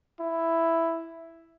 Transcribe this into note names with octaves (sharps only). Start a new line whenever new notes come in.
E4